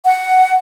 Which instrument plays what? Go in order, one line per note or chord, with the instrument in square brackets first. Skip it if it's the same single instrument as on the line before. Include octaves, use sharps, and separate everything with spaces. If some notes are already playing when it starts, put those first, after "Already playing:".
[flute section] F#5